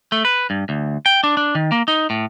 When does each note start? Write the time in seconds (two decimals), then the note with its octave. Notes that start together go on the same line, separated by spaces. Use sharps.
0.12 A3
0.25 B4
0.50 G2
0.69 D2
1.06 G5
1.24 D4
1.37 D4
1.55 D#3
1.72 A#3
1.88 D#4
2.10 A2